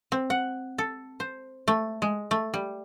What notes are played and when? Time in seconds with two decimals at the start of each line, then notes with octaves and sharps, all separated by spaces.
0.12 C4
0.30 F#5
0.78 A4
1.20 C5
1.68 A3
2.02 G#3
2.31 A3
2.54 G3